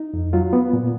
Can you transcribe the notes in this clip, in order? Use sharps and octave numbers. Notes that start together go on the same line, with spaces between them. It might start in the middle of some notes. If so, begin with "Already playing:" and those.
Already playing: D#4
F2
F#3 F4
B3
A#2